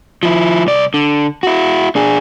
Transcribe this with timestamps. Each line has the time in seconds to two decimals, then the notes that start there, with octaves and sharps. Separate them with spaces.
0.23 F3 E4
0.67 C2 D5
0.94 D3
1.43 E4 F#4
1.96 D4 G#4